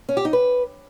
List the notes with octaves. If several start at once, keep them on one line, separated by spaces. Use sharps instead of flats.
C#4
G4
D#4
B4